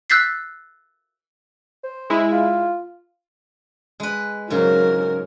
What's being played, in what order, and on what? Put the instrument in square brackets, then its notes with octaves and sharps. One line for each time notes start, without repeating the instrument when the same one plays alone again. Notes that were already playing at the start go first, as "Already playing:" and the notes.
[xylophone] E6 F#6 G6 A6 B6 C7
[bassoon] C5
[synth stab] G#3 E4
[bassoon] F4
[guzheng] G#3 B4
[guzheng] G#2 C#3 [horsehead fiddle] F#3 A#4